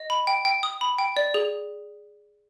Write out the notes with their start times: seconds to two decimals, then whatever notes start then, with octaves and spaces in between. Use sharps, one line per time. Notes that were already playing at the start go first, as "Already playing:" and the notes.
Already playing: D#5
0.10 B5
0.27 G5
0.45 G5
0.63 D#6
0.81 B5
0.98 G5
1.17 D5
1.34 G#4